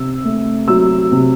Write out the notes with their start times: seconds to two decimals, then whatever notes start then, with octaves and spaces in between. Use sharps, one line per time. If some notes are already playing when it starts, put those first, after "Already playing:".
Already playing: C3 E6
0.24 A3
0.68 F#3 E6
1.12 C3